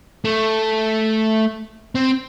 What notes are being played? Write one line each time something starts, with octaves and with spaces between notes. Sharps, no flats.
A3
C4